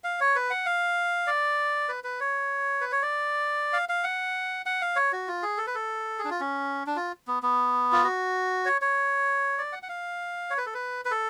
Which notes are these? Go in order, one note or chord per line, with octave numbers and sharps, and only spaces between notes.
F5
C#5
B4
F#5
F5
D5
B4
B4
C#5
B4
C#5
D5
F5
F5
F#5
F#5
F5
C#5
F#4
F4
G#4
A4
B4
A4
G#4
D4
F4
C#4
D4
F4
B3
B3
F4
F#4
C#5
C#5
D5
F#5
F#5
F5
C#5
B4
A4
B4
B4
A4